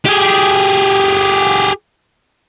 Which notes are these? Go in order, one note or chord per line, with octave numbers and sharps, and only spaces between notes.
G4 G#4